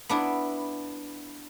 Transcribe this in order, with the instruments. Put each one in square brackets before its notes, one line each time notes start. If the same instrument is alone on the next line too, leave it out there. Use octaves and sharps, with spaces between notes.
[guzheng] B3 D4 E4